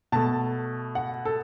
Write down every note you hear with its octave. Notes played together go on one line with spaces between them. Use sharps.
B2 A3 A5
F#5
A4